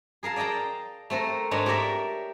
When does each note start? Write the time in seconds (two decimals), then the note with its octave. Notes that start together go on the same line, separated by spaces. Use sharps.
0.23 G#4 A#4 F5 A5
0.36 D5 D#5 G5 A5 A#5
1.10 A3 C4 A4 A#4
1.51 G#2 G#3 D4 D#4 C#5
1.66 G4 A#4 C#5 D5 E5